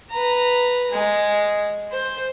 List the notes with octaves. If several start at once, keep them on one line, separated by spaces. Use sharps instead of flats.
B4 A#5
G#3
C5